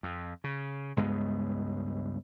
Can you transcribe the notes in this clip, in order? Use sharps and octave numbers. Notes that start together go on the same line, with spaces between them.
F2
C#3
C#2 G2 G#3 B3